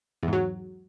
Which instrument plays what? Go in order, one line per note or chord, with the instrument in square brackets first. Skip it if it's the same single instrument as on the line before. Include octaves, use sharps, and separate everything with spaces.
[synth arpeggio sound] E2
G#2
F#3